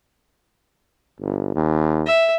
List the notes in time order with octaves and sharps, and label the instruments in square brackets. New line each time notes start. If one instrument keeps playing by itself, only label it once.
[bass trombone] G1
D#2
[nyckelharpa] E5